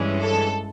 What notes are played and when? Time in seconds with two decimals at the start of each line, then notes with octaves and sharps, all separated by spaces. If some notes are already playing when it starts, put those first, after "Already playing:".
Already playing: G2 E3 G#3 C#4
0.23 A4